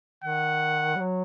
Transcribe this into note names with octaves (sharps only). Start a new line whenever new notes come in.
D#3 F#5
G3
F#3